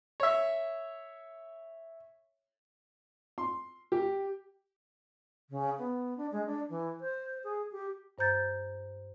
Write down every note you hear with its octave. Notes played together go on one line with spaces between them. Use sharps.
C#5 E5
C6
G4
C#3
B3
D4
G#3
D4
E3
C5
G#4
G4
G2 C5 A#5 G6 A6